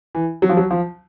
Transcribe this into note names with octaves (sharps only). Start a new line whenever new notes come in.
E3
F#3
F3
F#3
F3